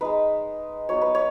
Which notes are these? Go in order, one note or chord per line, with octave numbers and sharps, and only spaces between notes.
G#3 D#4 B4
F#3 B3 D#4 C#5
B4
C#5